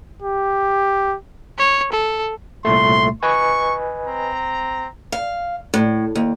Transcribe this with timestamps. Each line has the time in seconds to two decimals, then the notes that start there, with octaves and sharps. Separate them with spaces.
0.22 G4
1.58 C#5
1.93 A4
2.65 C2 A#2 A3 C6
3.23 B4 D#5 G#5 C#6
4.07 C4 A#5
5.12 F5
5.74 A2
6.15 D#2